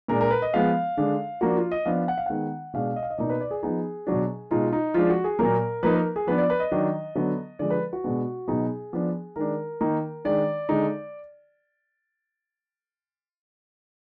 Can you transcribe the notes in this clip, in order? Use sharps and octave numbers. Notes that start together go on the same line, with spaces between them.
A#2 G#3 D4 A#4
A#4
B4
D#5
F3 G#3 B3 F5
D3 G#3 D4
F3 A#3 D4 F#4
F4
D#5
F3 B3 D4 F5
F#5
F5
D#3 G#3 B3 F#5
B2 G#3 D4 F5
D#5
F5
D#5
B2 A#3 D#4 D5
B4
D5
G#4
F3 B3 D#4 G#4
B2 F#3 D4
B2 G#3 D#4 F4
D#4
F3 G#3 D4 F4
F#4
G#4
A#2 F#3 A#3 A#4
F3 A#3 D#4 B4
A#4
G#4
F3 B3 D4 B4
D5
B4
D#5
D#3 F#3 D4
D3 F#3 B3
D3 F3 G#3 D5
B4
F#4
B2 G#3 B3 D4
B2 F#3 B3 D#4 G#4
F3 B3 D4
D#3 G#3 D4 A#4
D#3 A#3 D#4
D#3 G#3 D4 D5
D3 G#3 D#4